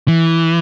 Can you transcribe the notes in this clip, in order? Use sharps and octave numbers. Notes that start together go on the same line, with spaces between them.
E3